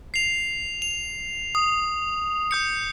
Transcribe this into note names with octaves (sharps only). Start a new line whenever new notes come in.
C7 F7
F7
D#6
D#6 G6 C#7